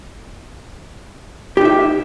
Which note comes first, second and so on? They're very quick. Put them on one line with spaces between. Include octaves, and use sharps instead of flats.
G4 D#4 E5